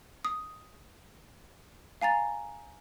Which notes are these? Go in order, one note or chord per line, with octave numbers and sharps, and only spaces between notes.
D#6
F5 G#5 A#5 A6